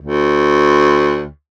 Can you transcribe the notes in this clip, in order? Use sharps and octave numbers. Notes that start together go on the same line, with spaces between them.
D2